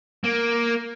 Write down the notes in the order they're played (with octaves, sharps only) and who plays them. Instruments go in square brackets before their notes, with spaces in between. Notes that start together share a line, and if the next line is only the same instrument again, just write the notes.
[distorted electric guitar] A#3